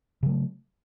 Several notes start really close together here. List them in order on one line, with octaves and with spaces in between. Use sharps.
C#3 F#3 A3